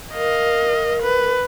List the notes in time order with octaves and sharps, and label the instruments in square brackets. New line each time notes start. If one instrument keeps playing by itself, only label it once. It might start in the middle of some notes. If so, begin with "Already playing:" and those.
[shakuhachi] A#4 [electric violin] D#5 F5
[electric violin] B4